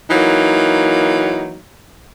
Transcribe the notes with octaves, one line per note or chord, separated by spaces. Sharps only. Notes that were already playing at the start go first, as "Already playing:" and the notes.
E3 F#3 A#3 D#4